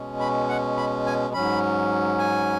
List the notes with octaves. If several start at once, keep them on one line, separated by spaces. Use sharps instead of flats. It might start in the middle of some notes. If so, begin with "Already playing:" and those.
Already playing: B2 G#3 C#4
B5
F#5
B5
G#5
G#2 F#3 C#4 B5
G#5